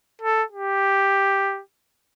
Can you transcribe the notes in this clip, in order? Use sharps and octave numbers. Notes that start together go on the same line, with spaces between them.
A4
G4